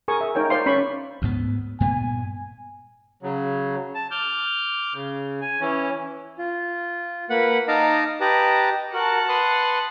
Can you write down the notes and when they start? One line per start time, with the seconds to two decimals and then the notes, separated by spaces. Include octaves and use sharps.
0.08 G#4 A#4 G#5 C#6 D#6
0.21 E5
0.35 D#4 A#4 C#5 G5
0.50 C5 D5 F5 C6
0.66 C#4 D5 B5 C#6
1.22 D2 G#2 B3
1.80 G2 A#2 B3 G#5
3.23 C#3 F#3
3.95 A5
4.11 D6 F6 G6
4.94 C#3
5.42 G#5
5.60 E3 C#4
6.38 F4
7.30 A#3 B4 F#5 B5
7.68 D#4 D#5 F5 A5 A#5 D6
8.21 G4 B4 D#5 A5 A#5 D6
8.93 F#4 A#4 F#5 A5
9.29 B4 C6 D#6